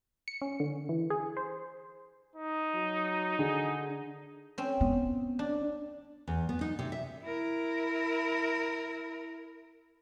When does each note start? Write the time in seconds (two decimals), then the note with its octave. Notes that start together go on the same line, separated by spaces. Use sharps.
0.28 C#7
0.42 C#4
0.60 D3
0.89 E3
1.10 G#4
1.37 C5
2.35 D#4
2.74 F#3
3.39 D3 G#4
4.58 C4 C#4
4.81 B3
5.39 D4
6.28 E2
6.49 B3
6.61 D#4
6.79 C3
6.92 E5
7.24 E4 A#4